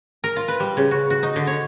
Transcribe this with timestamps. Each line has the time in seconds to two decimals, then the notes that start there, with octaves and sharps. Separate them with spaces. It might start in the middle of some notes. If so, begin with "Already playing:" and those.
0.24 A#4
0.36 F4
0.48 B4
0.60 G3
0.77 C#3
0.91 F#4
1.10 F#4
1.23 D#4
1.36 D3
1.47 C#5